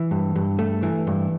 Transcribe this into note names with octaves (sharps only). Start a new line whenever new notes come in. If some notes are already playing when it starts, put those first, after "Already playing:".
Already playing: E3
G2
G2
A3
E3
G2